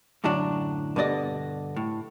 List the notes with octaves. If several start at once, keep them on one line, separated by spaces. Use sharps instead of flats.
F#2 A2 D3 F#3 D4
G2 B2 D3 D5 D#5
A2